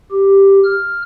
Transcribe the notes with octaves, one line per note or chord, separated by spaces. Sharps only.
G4
F6